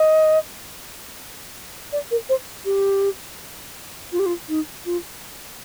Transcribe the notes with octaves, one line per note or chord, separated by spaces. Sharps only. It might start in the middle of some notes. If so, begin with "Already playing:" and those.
Already playing: D#5
D5
A#4
C5
G4
F4
G4
F4
D#4
F4